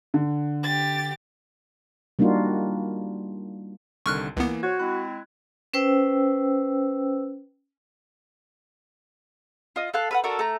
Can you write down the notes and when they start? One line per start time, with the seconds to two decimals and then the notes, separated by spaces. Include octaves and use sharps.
0.14 D3
0.63 G4 A6
2.19 G3 A#3 D4 D#4 F4 F#4
4.06 C2 D3 D#3 C#6 F6 F#6
4.37 C#2 E3 A#3 B3
4.63 F#4 C5 C#5 G#6
4.80 G#3 C4 E4 F#6
5.74 C#4 B4 C5 G5 E6
9.76 F4 D#5
9.94 A4 F5 F#6
10.11 B4 F5 F#5
10.24 D4 F#4 A4 A#4
10.39 A3 A#5